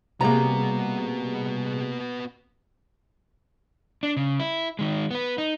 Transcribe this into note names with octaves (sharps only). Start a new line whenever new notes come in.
C3 G3 A#3 B3 F#4 G#4 A#5
D4
C#3
E4
D#3 G#3
B3 B4
D#4